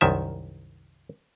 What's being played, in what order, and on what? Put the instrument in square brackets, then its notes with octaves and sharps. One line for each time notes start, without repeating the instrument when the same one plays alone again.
[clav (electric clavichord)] C2 F#2 D#3 E5